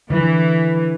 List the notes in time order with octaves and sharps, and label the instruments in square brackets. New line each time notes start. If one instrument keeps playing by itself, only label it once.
[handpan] D3 [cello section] E3